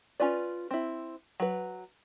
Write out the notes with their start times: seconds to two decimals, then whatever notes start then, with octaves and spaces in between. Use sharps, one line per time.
0.20 C#4 F4 B4 D5
0.71 C4 E4
1.40 F#3 B4